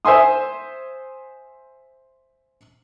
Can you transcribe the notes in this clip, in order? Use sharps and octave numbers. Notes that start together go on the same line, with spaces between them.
C5 E5 G#5 C6 D#6